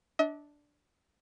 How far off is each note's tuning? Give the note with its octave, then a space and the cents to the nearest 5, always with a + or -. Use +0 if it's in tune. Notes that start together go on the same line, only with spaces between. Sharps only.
D4 +0 D#5 +45